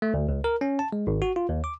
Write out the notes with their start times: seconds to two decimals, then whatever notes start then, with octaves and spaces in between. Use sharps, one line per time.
0.02 A3
0.14 D2
0.29 C#2
0.44 A#4
0.61 C#4
0.79 A5
0.92 G#3
1.07 G#1
1.22 F#4
1.36 F4
1.49 D#2
1.64 D6